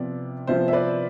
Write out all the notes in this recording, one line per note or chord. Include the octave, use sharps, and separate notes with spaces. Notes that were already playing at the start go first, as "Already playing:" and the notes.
Already playing: C3 F3 B3 F4 D5
C3 F3 B3 F4 C5 E5
E5
B4 D5